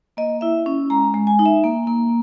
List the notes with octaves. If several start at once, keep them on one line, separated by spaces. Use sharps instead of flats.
A#3 D#5
E4 E5
C#4
G#3 A#5
G#3
G#5
D#4
E5
A#3
A#3